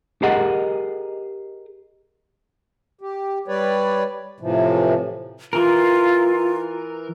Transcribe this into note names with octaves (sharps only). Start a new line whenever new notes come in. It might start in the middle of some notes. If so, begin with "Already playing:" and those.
G4 G#4 A#4 D#5 F#5
G4
G3 B4 C#5 D5
A2 C3 E3 F3
E3 F4 A#4